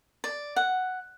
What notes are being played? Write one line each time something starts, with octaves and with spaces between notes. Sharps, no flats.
D5
F#5